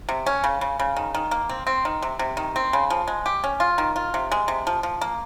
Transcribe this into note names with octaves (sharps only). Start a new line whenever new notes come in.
C3
C#4
C#3
C#3
C#3
D#3
D#3
A#3
C4
C4
D#3
C3
C3
D#3
C4
C#3
F3
G#3
G4
C#4
F4
D#3
F4
C3
G#3
C3
F3
F3
A#3